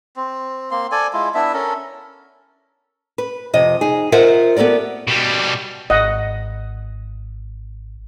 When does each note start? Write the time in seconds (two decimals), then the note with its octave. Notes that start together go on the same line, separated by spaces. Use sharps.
0.16 C4
0.71 A#3 C4 C6
0.92 A4 D5 G#5
1.13 G#3 E4 F4
1.34 B3 D4 E4 E5
1.54 C#4 A4 A#4
3.18 B4
3.54 F2 C3 D#5
3.81 D#4 G#4
4.12 F4 A#4 C5 D#5 E5 F#5
4.57 B3 G4 A4 A#4 D5
5.07 B2 G3
5.90 G#1 D#5 F#5